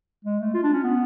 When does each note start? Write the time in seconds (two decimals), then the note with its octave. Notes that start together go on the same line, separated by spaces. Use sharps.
0.24 G#3
0.39 A3
0.54 F4
0.63 D4
0.73 C#4
0.83 B3